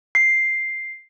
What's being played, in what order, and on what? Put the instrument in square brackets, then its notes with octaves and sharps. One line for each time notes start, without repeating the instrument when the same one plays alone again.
[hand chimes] C7